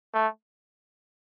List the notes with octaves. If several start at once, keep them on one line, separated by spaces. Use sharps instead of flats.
A3